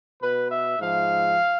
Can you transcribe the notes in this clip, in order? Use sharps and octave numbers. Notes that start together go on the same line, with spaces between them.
B2 B4
E5
G#2 F3 F5